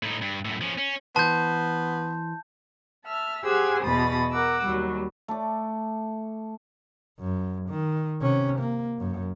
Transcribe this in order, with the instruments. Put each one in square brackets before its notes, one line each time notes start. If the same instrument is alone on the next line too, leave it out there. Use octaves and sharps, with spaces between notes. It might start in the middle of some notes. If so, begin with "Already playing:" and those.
[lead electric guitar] A2 D#4
G2
F#2 A2
F3 C#4
C#4
[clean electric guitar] E3 C5 [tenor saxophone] B3 [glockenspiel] A5 G6
[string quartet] E5 A5 F6
G4 G#4 C5 F#5 G#5 E6
E2 B2 B5 D#6 A6
A#4 F#5 D6 E6
D#2 F#3 G3
[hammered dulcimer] A3 D6
[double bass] F#2
D#3
C3 C#4
A#3
F#2